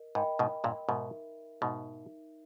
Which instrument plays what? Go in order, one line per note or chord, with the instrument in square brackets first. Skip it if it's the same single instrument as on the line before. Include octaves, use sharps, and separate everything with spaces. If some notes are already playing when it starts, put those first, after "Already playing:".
Already playing: [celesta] A#4 D#5
[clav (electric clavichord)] G#2 [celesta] A#4 D#5 G5 B5
[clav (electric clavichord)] G#2 B2
G2 A#2
[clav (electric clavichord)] G#2 B2 [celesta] D#4 A#4 E5
[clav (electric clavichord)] G#2 B2 [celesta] D#4 A#4 E5